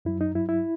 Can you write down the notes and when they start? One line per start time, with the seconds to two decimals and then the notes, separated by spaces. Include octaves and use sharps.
0.05 F#2 F#3 E4
0.21 D#4
0.35 G2 F#3 E4
0.49 E4